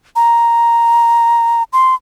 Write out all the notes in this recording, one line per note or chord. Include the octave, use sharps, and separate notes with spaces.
A#5
C6